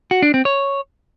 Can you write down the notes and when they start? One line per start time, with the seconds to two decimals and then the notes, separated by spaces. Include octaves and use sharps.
0.11 F#4
0.22 D4
0.34 C4
0.45 C#5